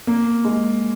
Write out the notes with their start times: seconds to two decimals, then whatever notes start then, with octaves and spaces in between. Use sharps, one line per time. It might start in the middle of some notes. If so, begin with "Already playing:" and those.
0.07 A#3
0.45 G#3